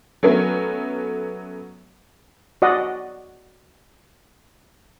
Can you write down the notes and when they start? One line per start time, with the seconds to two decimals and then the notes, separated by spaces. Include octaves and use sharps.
0.23 F#3 A3 B3 C#4
2.62 F#4 D5 D#5 F#5